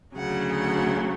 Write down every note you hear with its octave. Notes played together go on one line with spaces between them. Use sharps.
D2 C#3 F#3 F#5
F#5